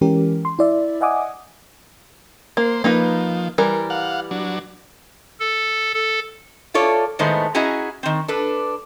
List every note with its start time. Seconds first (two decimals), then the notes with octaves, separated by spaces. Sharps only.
0.01 E3 G#3 C#4 G4 A#4
0.45 C6
0.59 E4 D5 E5
1.01 D#5 E5 F#5 G#5 D6 D#6
2.57 A#3 C5
2.84 F3 A#3 D#4 B4
3.58 E3 G3 A#4
3.90 F5 F#5
4.31 F#3 D4
5.40 A4
5.94 A4
6.74 E4 F4 A4 C#5 D5
7.19 A2 D#3 G#3 A3 B3 C5
7.55 C#4 E4 F#4 G#4 D#5 A#5
8.03 D#3 C4
8.28 D4 A4 B4